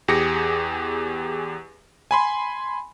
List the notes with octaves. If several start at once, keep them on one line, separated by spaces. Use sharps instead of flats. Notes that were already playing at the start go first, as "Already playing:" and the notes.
E2 G4 G#4 A#6 C#7
G#5 B5 C6